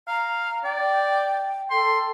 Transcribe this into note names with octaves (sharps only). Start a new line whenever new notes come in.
F5 A#5
D5 G5
A4 G5 C6